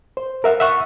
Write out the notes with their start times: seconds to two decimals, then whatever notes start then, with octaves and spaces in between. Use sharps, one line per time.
0.17 C5
0.44 A#4 E5 F#5
0.60 E5 F#5 C#6